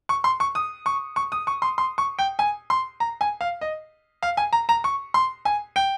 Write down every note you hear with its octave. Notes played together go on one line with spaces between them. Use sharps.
C#6
C6
C#6
D#6
C#6
C#6
D#6
C#6
C6
C6
C#6
G5
G#5
C6
A#5
G#5
F5
D#5
F5
G#5
A#5
A#5
C#6
C6
G#5
G5